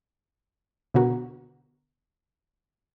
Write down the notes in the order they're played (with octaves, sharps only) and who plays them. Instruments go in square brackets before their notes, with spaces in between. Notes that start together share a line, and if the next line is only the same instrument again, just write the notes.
[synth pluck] B2 D3 B3 F#4 A#4